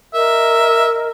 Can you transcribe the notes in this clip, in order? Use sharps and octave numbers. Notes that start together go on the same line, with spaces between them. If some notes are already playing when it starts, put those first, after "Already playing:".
A#4 D#5 E5